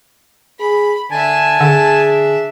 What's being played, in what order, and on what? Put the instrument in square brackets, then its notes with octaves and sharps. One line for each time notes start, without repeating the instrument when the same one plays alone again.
[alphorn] G#4 [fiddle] B5
[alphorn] D3 [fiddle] D4 E5 [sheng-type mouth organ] G#5 A5
[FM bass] D3 [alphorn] G#4